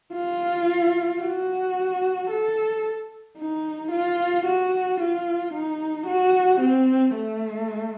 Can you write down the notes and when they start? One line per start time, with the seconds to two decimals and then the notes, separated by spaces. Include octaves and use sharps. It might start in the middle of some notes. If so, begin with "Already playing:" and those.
0.14 F4
1.21 F#4
2.30 A4
3.38 D#4
3.91 F4
4.45 F#4
5.00 F4
5.54 D#4
6.07 F#4
6.61 C4
7.16 A3